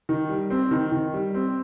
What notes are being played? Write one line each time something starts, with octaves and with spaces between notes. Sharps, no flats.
D#3
G3
C4
D#3
D#3
G3
C4